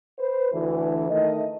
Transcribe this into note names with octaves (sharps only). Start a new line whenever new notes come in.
B4 C5
D2 E3
D#3 A3 D#5